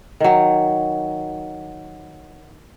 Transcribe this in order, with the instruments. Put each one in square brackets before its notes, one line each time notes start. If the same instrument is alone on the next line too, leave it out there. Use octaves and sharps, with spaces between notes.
[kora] D#3 F#3